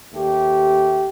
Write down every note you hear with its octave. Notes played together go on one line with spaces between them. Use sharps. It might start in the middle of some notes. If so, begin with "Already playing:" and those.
D#2 A3 G4